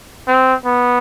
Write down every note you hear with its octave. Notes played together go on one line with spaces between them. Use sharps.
C4
B3